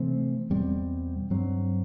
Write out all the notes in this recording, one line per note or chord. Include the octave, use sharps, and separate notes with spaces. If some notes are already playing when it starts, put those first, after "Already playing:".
Already playing: C3 E3 A3 C4
E2 B2 G3 C4
G2 F#3 C4